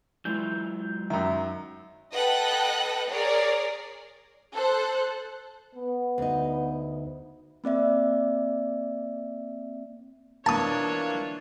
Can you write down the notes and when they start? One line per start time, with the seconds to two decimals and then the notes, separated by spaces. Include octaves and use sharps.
0.25 E3 F#3 G#3 F4 G6
1.10 F#2 D#3 E5
2.13 A4 B4 D#5 F#5 G5 F#6
3.10 G#4 A#4 C#5 D5
4.54 A4 C5 F#6
5.75 B3
6.18 D2 D#4
7.64 A#3 C4 D5 E5
10.46 E3 A#3 D4 F4 C#5 A5 D#6